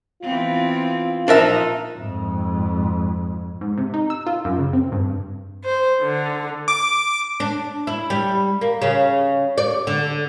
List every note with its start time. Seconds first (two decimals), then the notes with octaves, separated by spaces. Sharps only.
0.23 E3 B3 C4 F4
1.28 A#2 F3 D4 D#4 A#4 E5
1.94 F2 G#2
3.61 G#2
3.78 C3
3.94 D#4
4.10 E6
4.27 F4
4.45 F#2
4.59 C#3
4.73 C4
4.92 G2
5.10 G2
5.64 C5
6.02 D3
6.68 D6
7.40 D4
7.87 E4
8.10 G3
8.61 A#3
8.82 C#3
9.58 D5
9.87 D3